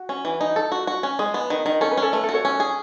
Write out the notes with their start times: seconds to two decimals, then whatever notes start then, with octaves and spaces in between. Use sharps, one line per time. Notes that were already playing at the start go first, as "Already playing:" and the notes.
Already playing: F#4
0.09 C#4
0.25 E3
0.41 D#4
0.56 A4
0.72 F#4
0.87 F#4
1.03 C#4
1.19 G#3 G#4
1.34 B3
1.50 D#3
1.66 D#3
1.81 C#4 A4
1.92 B4
1.97 C#4 A4 C#5
2.13 A3 B4
2.24 A4
2.29 F#4
2.34 A4 C#5
2.45 C#4
2.60 G#4